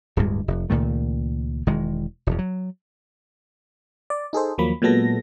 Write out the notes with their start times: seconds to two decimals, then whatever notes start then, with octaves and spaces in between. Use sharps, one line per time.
0.17 D1 D2 G2 G#3
0.48 F1
0.70 C#2 A#2 D#3 A3
1.67 E1 D#3 G#3
2.27 E1 F2
2.39 F#3
4.10 D5
4.33 D#4 G#4 A4 C5
4.58 D#2 F3 F#3 A#3 B5
4.82 A#2 F#3 G#3 B3 A4 A#6